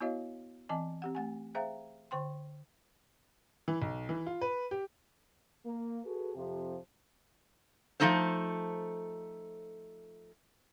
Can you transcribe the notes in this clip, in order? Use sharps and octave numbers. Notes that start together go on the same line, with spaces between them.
B3 E4 F#4 C#5 D#5 F5
E3 C4 D#5 G#5 A5
C4 G4 F#5
A3 F#5 G#5
G#4 C5 E5 F5 G5 A#5
D3 C5 G5 C6
E3
B1
E3
F4
B4
G4
A#3
F#4 G#4 A4 B4
F2 C3 F3 G4
F3 A3 A#3 D#4 A4 C5